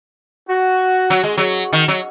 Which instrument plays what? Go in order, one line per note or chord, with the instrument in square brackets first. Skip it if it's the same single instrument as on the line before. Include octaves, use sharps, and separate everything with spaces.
[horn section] F#4
[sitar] F#3
G#3
F#3
D#3
F#3